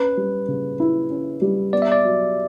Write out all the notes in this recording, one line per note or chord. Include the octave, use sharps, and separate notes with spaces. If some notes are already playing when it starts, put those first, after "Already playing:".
Already playing: C#4 B4
G3
C#3
E4
C#4
G3
B3 D5
E5
D5
F#3